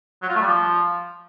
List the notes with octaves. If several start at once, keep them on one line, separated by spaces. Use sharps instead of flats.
F#3
F4
A3
G3
F3